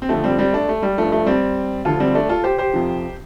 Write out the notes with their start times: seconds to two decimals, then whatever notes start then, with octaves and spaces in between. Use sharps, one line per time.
0.02 C4
0.09 F2 D3 F3 A3
0.24 G3 C4
0.38 G3 C4
0.53 A3 D4
0.69 A3
0.83 G3
0.98 G2 F3 A3
1.12 A3
1.26 G3 C4
1.85 D2 D3 F3 F4 A4
2.00 G3 C4
2.15 A3 D4
2.29 F4 A4
2.44 G4 C5
2.58 G4 C5
2.73 F2 C3 F3